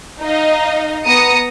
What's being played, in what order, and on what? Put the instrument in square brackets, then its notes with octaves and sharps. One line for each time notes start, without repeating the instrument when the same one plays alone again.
[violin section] D#4 D#5 F5
B3 A#5 D#6 A#6 C#7